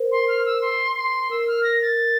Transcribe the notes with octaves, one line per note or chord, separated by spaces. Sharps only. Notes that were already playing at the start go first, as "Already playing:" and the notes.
Already playing: A#4 C5
C6
F6
E6
C6
C6
A#4 E6
F6
A#6
A6